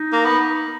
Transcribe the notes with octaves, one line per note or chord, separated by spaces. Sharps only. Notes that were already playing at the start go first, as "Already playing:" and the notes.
Already playing: D#4
A#3
B3